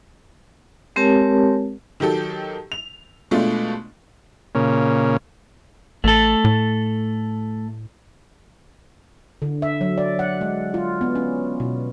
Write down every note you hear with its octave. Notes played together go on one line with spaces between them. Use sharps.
G#3 C4 G4 A#4 C#5 A5
D#3 F#3 G4 A4
F7
B2 G#3 A3 D4 F4
A#2 C#3
A1 A3 A4
A2
D3
E5
F#3
D5
F#5
G#3
F4
B3
C#4
B2